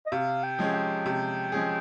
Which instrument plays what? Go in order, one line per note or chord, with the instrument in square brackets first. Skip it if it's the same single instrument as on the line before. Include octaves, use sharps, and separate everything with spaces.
[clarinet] D#5
[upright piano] C3 [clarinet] F5
[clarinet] G5
[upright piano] F3 G#3 C#4 G#4
[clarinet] G5
[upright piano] C3
F3 G#3 C#4 G#4